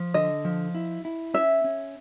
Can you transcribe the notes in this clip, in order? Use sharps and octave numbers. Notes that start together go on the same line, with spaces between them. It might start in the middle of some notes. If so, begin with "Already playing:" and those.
Already playing: F3
D3 D#5
F3
E4
E4
C#4 E5
C#4